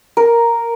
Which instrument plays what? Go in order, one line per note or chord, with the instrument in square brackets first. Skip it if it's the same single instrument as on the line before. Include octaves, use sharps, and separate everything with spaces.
[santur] A#4